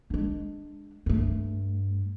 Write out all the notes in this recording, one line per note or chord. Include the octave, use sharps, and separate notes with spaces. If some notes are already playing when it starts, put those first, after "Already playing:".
G#3 D4
G2 A3